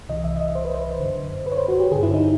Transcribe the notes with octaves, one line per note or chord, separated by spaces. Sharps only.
C2 C3 E3 D#5
E5
D#5
C5
B4
C5
F#2 D3
B4
C#5
C5
F#4
G4
G2 D3 G#4
E4
D#4